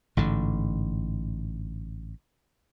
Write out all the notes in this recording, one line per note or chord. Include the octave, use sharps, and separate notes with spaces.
A1 G#2 D3